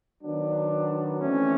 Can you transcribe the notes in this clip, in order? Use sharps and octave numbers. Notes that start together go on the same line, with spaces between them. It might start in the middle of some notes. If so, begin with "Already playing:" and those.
D#3 F#3 B3 D4
E3 A3 C4 C#4